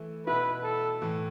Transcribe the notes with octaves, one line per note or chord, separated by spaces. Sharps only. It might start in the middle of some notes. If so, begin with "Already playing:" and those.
Already playing: E3 A3 E4
B2 B3 E4 B4
A4
A2 E3 A3